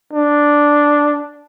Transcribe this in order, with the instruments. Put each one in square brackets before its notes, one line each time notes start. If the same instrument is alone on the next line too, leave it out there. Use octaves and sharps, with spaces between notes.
[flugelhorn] D4